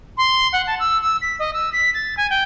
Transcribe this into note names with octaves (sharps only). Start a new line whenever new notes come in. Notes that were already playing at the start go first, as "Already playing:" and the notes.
C6
F#5
A5
E6
E6
B6
D#5
E6
B6
A6
G#5
G5